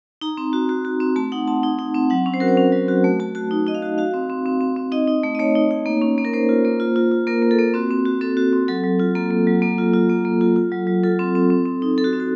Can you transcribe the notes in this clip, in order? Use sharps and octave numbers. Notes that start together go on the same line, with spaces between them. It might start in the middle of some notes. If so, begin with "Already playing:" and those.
D#4 A#5
C4
F#4
F#4
F#4
C4
A3 A5
D#4 F#5
C4 A5
D#4
D#4
C4
F#3 F#5
C#4
C5
F#4 A#4
C5
C#4
F#3
F#4
A3
A3 A5
F#4 A5
D#4
D#4 D#5
F5
F#4
F#4 F5
C4
C4
C4
C4
C4
D#4 D#5
D#4
A3
D#5
A3 C#5
D#4
D#4
A#3
C#4
A#3
A#4
A#3 C5
F4
A#3
F4
F4
F4
A#3 A#4
A#3
A4
A#3
C4 F#4
C4
F#4
C4 A4
F#4
C4
F#3 A4
F#3
F4
A#3 A4
A#3
F#3
A#3
F4
F4
A#3
A#3
F4
F4
F#3
F#3
F4 A4
C4
C4
C4
C4
D#4
C4 A4
F#4
C4
F#4